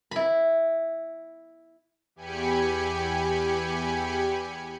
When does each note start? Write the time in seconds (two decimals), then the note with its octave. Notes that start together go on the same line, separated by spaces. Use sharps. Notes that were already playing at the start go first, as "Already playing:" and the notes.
0.11 E4 B5
2.16 E2 G4 G#5 B5 C#7